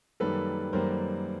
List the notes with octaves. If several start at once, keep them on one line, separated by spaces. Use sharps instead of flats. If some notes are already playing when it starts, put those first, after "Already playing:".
F#2 D#3 G3 A#3 A4 B4
F#2 D#3 G3 A#3 A#4 C5